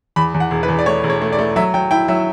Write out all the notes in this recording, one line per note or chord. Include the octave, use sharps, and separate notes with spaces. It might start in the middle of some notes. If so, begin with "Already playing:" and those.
E2 B5
E2
F#5
E1
B4
E2
D5
A3 C#5
E1
C#5
A3
D5
A3
F#3 E5
F#3 G5
E4 G5
F#3 E5